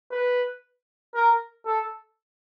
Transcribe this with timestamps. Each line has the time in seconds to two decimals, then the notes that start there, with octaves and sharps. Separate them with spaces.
0.11 B4
1.14 A#4
1.66 A4